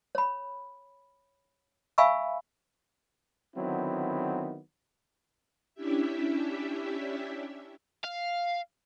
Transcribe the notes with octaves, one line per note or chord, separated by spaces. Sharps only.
C#5 B5
E5 F5 G#5 B5 C#6 E6
D3 D#3 F#3 B3 C4 E4
C#4 D4 E4 G4 E5
F5